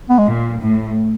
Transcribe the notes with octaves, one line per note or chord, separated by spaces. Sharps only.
B3
G#3
A#2
A2